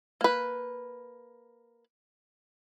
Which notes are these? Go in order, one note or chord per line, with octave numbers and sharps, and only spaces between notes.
A#3 B4